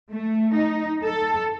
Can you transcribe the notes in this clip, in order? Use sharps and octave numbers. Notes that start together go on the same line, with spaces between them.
A3
D#4
A4